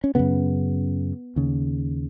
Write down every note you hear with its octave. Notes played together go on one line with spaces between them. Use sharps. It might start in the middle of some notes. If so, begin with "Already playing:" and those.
C#4
F#2 C#3 B3
D#2 C#3